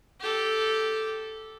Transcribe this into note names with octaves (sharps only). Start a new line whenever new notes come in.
G4 A4